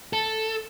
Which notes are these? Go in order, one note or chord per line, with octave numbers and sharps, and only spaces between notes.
A4